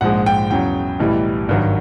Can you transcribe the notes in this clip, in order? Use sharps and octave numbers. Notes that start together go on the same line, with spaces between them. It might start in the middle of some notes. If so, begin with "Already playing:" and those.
A#1 G#2 F3 G#3 F#5
G5
E2 C#3 F#3 G5
B1 A2 E3 G3
G#1 G2 D#3 F#3